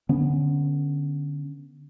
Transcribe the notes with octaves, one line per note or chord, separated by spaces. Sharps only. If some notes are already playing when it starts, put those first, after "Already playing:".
D3 B3 C#4